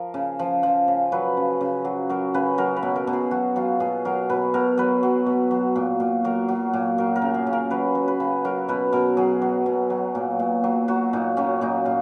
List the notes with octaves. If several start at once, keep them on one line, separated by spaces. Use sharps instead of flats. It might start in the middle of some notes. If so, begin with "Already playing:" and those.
Already playing: F3 A#4
C#3
F3
F3
C#3
F#3 B4
C#3
C#3
F#3
F#3 A#4
C#3 B4
F#3 A#4
B4
B2
A#4
B2
G#4
F#3 F#4
F#3 F4
B2 G#4
F#3 A#4
B2 B4
B2 A#4
F#3 B4
F#3
B2
F#3
A#2
A#2
F#3 A#4
F#3
A#2
F#3 A#4
A#4
C#3
G#4
C#3
A#4
F#3 B4
F#3
B4
C#3
F#3 A#4
B2 B4
B2 A#4
F#3 G#4
F#3
B2
F#3
A#2
A#2
F#3
F#3 F#4
A#2 D#4
F#3 C#4
A#2 D#4
A#2 F4